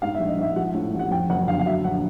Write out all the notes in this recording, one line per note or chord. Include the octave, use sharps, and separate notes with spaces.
G#2 F5
A#1 E5
D#5
G#2 E5
F3 F#5
A2
A1
F#5
F2 G5
F#1 F#5
D3 F5
F5
F#3 E5
A#1 F#5